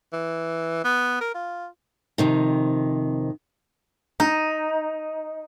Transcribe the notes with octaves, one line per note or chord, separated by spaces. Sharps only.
E3
B3
A#4
F4
F2 C3 D#3
D#4